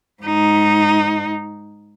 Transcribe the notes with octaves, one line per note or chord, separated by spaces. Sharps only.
G#2 D#4